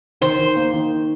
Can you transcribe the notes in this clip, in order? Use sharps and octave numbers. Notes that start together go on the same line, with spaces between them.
D#3 C5
D#3
A#3
D#3